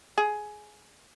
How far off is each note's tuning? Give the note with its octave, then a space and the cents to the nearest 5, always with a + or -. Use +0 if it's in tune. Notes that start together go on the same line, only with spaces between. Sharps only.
G#4 +15